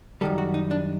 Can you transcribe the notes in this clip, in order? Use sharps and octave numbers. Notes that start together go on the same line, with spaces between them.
F#2 D#3 G3 A4
F#4
D#4
D4